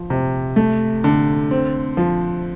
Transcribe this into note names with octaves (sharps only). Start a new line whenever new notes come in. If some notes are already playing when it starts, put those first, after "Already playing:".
Already playing: F3
C3
A3
D3
C4
F3